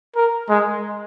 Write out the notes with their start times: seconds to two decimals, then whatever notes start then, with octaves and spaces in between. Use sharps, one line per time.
0.16 A#4
0.49 G#3